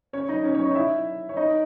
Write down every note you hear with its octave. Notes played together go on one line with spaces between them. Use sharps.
C#4 C#5
D#4 D#5
C#4 C#5
C#4 C#5
D#4 D#5
E4 E5
C#5
D#4 D#5